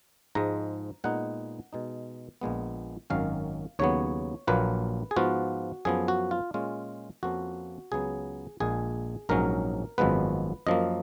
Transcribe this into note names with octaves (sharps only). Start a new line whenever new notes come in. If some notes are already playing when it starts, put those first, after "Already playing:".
G#2 F3 G#3 A#5
A#2 G#3 B3 D#4 F#5
B2 G#3 D#4
A#1 A#2 G#3 B3
G#1 F#2 D#3 F#3 C#4 F5
D#2 C#3 F#3 B3 C#5
A#1 A#2 F#3 A#3 F4 B4
G#4
G#2 F3 B3 F4 F#4
F#2 F3 B3 G#4
F#4
F4
A#2 G#3 C#4 F4
F2 F3 A#3 C#4 F#4
C#2 C#3 F#3 B3 G#4
A#1 A#2 G#3 G#4
A#1 G#2 F#3 C#4 A#4
G#1 F#2 F3 G#3 B3 B4
F#2 F3 A#3 D#5